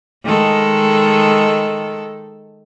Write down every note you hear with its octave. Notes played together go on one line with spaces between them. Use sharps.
D#3 G#3 A4